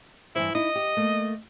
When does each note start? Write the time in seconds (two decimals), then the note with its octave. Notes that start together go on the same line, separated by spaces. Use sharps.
0.35 G2 E3 E4 C5
0.55 D#4 E4 D#5
0.76 G4
0.97 A3 A#3